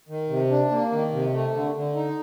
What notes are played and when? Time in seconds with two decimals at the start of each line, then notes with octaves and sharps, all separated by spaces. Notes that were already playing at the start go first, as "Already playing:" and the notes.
0.09 D#3
0.29 C3
0.50 D4
0.71 A#3
0.92 D#3
1.13 C3
1.33 A3
1.54 D3
1.75 D3
1.96 D#4